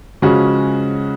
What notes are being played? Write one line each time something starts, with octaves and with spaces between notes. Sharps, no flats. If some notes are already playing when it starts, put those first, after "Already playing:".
C#3 F3 G#3 C#4 F#4